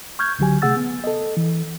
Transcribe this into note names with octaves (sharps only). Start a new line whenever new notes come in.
C#6 F6 G6 G#6
C#2 D3 F#3 G4 G#5
C3 A3 G#4 F#5 E6 A6
B3
A4 D#5
E3